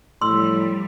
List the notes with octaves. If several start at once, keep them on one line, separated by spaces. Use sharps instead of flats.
A2 F3 G3 C6 E6